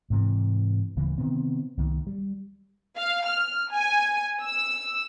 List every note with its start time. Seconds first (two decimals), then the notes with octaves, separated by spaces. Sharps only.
0.10 G#2 C3 E3
0.96 D1 C#3 E3 A#3
1.18 C3 D#3 B3 C4
1.78 C2 D#3 A#3
2.07 G3
2.97 F5
3.26 F6
3.72 G#5
4.42 E6